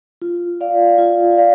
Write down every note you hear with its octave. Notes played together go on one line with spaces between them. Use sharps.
F4
D5 F5
F4
D5 F5